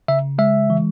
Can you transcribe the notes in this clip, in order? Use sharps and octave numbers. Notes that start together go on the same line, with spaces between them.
C#3 E5
G#3 E5
E3